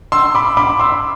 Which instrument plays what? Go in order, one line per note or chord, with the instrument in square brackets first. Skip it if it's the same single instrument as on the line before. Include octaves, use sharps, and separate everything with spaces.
[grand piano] C6 E6
B5 D6
B5 D6
C6 E6